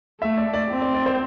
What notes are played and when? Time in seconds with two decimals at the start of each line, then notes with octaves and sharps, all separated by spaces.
0.21 A3 E5
0.37 D5
0.53 D5
0.70 C4
0.82 D5
0.94 D5
1.06 C5